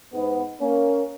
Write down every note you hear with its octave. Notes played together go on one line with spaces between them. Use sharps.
G#2 B3
A#3 C#4